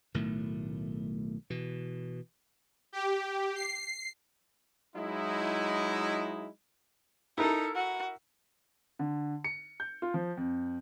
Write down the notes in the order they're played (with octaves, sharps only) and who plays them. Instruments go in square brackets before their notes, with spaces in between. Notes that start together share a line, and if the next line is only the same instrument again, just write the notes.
[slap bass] B1 A2 D#3 A3
B2 E3
[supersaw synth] G4
C7
[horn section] F#3 G#3 D#4 E4
[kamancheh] D#4 A4 [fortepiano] E4 A#4
[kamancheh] F#4
[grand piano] D3
C#7
G6
F4
F3
F2